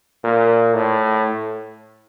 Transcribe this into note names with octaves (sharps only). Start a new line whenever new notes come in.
A#2
A2